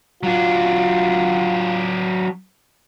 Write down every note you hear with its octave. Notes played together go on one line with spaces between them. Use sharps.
F#3 D4 F4